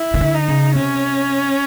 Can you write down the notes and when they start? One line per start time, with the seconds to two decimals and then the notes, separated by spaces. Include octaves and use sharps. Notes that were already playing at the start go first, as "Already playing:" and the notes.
Already playing: E4
0.14 D#3
0.21 D3
0.34 D#4
0.48 C#3
0.75 C3 C#4